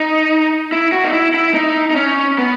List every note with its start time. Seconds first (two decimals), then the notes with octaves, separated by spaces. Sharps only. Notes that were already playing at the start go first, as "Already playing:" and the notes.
Already playing: D#4
0.72 E4
0.92 F#4
1.04 D#4
1.13 E4
1.34 E4
1.54 D#4
1.91 D#4
1.96 C#4
2.38 B3